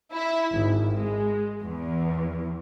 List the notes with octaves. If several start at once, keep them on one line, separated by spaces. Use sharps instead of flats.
E4
G#1
G#3
E2